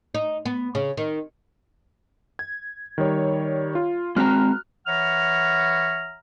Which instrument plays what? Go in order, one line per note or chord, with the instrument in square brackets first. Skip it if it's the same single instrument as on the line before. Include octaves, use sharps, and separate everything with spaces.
[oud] D#4
B3
C#3
D#3
[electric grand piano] G#6
D#3 G3 C#5
F4
[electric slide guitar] G#3 C4 A#5 [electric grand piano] F#4 F6 F#6
[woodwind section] E3 C#5 E5 F#5 A#5 F6